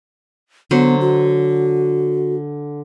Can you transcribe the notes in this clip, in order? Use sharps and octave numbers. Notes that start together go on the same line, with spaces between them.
D3 F#3 B3 C5
F#4